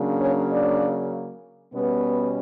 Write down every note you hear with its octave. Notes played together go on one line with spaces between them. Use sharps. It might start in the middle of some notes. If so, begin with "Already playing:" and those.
Already playing: C#3 F#3 A#3 D4
C#4 C#5
D4 D5
B2 G3 B3 C#4 B4